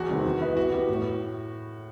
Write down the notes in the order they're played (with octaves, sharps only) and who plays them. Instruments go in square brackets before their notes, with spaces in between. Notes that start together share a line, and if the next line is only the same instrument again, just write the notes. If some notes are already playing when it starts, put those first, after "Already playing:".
Already playing: [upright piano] E2 [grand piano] F#4
[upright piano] C3 D#3 G3 C4
E3
B3 E4 B4
[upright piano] E3 [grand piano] F#4
[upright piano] B3 E4 G4
A2